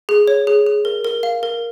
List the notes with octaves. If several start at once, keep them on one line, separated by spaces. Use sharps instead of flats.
G#4
C#5
G#4
G#4
A#4
A#4
F5
A#4